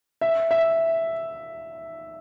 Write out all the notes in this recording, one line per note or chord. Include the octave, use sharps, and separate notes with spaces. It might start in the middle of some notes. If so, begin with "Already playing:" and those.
E5
E5